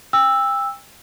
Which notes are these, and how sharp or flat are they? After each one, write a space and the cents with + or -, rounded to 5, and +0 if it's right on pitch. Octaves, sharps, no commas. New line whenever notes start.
G5 +30 E6 +0